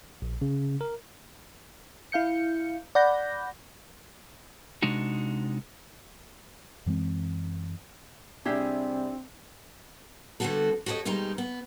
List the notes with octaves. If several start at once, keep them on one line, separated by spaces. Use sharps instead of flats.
A#1
C#3
A#4
E4 F5 G6 C#7
D5 F#5 B5 G6 A#6
C3 G#3 D4 D#4 F#4
F#2 E3 G#3 C4
C3 G3 C4 D4 E4 G4 G#4
D3 G3 A3 B3 F#4 A4
F#4 G4 A4 C#5 D#5
B2 D#3 G3 G#3 D#4 A#5
B3